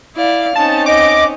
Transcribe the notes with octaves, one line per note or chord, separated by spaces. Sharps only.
E4 D5 F5
C4 C#4 D#4 A5
D#5 D6